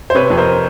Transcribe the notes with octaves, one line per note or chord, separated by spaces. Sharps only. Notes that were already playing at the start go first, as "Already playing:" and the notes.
C5
C3 B4 C#5
F2
A#4 C5